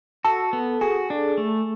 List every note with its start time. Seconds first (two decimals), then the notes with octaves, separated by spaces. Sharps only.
0.24 F#4 A4
0.53 B3
0.81 F#4 G#4
1.10 D4
1.38 A3